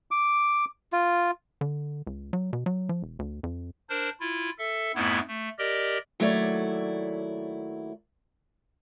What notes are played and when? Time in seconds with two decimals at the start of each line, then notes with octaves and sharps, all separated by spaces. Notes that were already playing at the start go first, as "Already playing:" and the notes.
0.11 D6
0.93 F4
1.61 D3
2.07 C#2
2.33 F#3
2.53 B2
2.66 F#3
2.89 F3
3.02 E1
3.19 D2
3.43 F2
3.90 D4 A#4 C5
4.20 E4 F4
4.59 A4 E5
4.95 F2 G#2 A3 B3 E4
5.28 A3
5.58 G4 A#4 D5 D#5
6.20 D#2 F#3 A3 E4 C#5 D5